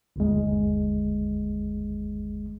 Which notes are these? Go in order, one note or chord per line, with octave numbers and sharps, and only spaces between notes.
G1 D#2 G#3